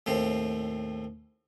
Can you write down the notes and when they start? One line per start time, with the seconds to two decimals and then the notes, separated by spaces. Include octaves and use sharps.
0.06 D#2 A2 C4